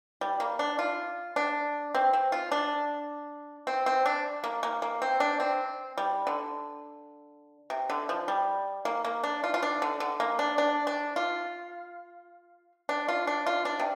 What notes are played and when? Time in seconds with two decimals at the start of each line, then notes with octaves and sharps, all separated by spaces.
0.21 G3
0.40 A#3
0.59 D4
0.79 F4
1.36 D4
1.95 C4
2.13 C4
2.32 F4
2.52 D4
3.67 C4
3.86 C4
4.06 D4
4.44 A#3
4.63 A#3
4.82 A#3
5.02 C4
5.20 D4
5.40 C4
5.98 G3
6.27 D3
7.70 C3
7.90 D3
8.09 F3
8.28 G3
8.85 A#3
9.05 A#3
9.23 D4
9.44 F4
9.54 F4
9.62 D4
9.82 D3
10.00 D3
10.20 A#3
10.39 D4
10.58 D4
10.87 D4
11.16 F4
12.89 D4
13.08 F4
13.27 D4
13.46 F4
13.65 D4
13.79 C3